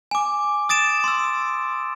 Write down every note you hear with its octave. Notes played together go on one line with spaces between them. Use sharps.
G#5 D6
D#6 A6 D7 E7
C6 E6